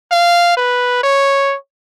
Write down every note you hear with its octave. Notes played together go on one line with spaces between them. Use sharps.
F5
B4
C#5